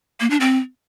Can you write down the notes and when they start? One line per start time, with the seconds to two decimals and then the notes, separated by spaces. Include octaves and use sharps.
0.20 A#3
0.30 D4
0.40 C4